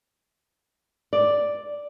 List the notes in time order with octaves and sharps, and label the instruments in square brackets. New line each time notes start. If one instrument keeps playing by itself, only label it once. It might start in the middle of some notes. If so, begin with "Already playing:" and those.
[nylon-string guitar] D5